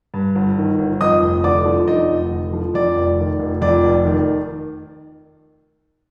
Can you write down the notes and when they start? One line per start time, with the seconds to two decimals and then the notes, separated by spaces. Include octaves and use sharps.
0.14 G2
0.35 G1
0.57 D#3
0.79 G1
1.01 F2 D#5 D#6
1.22 F1
1.44 D3 D5 D6
1.65 F3
1.88 F2 D#4 D#5
2.09 F1
2.31 D3
2.53 F3
2.74 F2 D5
2.96 F1
3.19 D#3
3.40 F1
3.62 F2 D5
3.84 F1
4.05 D#3